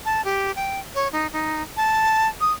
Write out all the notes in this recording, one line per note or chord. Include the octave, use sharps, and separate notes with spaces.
A5
G4
G5
C#5
D#4
D#4
A5
D#6